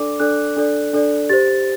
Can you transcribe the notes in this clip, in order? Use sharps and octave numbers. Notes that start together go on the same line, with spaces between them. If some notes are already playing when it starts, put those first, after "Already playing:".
Already playing: D4 A4 D5 D6
D4 A4 D5 F#6
D4 A4 D5
D4 A4 D5
G4 C5 A6